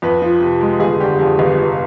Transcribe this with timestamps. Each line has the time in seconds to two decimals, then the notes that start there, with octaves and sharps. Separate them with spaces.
0.02 F2 B4
0.22 F3
0.41 C3
0.61 G#3
0.80 G1 G#4
1.00 D3 G4
1.19 F2 G#4
1.39 G1
1.58 F1